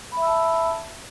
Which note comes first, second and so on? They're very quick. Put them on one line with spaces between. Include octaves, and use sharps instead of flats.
B5 E5 E6 A5